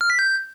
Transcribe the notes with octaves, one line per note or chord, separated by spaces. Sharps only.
F6
B6
G6